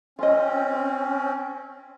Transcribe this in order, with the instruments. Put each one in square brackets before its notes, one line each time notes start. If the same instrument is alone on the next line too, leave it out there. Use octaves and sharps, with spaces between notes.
[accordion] C4 C#4 [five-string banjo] F4 D#5